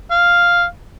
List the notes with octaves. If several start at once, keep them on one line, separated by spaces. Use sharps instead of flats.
F5